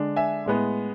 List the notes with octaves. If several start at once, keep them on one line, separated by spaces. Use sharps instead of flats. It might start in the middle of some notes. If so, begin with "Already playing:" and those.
Already playing: D3 G#3 D4
E5 G#5
A2 G#3 B3